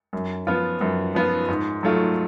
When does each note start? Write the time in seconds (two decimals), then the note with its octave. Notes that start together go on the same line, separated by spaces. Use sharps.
0.13 F#2
0.47 F3 B3 F4
0.81 F#2
1.15 F3 B3 F4
1.48 G#2
1.83 F#3 A3 F4